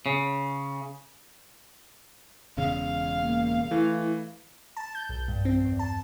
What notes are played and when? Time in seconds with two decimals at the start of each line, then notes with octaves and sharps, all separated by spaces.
0.06 C#3
2.57 E1 E2 C#3 F5
3.22 A#3
3.71 E3 A3 E4
4.77 A5
4.95 G6
5.09 B1
5.28 G2
5.45 C4
5.65 E2
5.79 A5